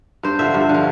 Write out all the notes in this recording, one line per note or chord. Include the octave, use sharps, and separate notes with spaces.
G2 C5
D3 F3 E5
G2
D3
F3